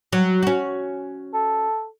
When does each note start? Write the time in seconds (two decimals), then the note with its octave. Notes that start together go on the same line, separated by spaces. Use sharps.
0.12 F#3
0.42 C#4 F#4
1.34 A4